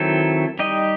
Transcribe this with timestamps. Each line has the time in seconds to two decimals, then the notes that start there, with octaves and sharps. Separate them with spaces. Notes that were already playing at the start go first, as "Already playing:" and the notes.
Already playing: D#3 F#3 C4 E4 A4
0.59 G3 D#4 G4 D#5